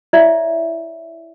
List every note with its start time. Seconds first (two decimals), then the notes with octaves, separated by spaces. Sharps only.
0.13 E4 C#5 D5 E5